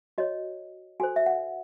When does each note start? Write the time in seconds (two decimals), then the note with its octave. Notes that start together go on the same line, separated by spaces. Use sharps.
0.18 F#4 C#5 D#5
1.00 F#4 A4 C5 G#5
1.16 E5
1.26 F#5